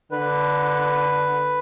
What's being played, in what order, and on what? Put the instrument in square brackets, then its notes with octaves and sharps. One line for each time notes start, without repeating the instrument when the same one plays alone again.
[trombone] D3 [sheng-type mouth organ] B4